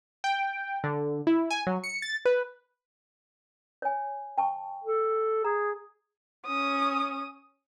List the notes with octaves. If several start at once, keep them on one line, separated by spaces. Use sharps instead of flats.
G5
D3
E4
G#5
F#3
C#7
A6
B4
C#5 G#5
G5 A5 C#6
A4
G#4 A#5
C#4 D#6